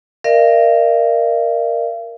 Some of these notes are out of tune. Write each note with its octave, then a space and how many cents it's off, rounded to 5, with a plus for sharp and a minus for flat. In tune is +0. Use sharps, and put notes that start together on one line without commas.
A#4 +0 D5 +45 F5 -45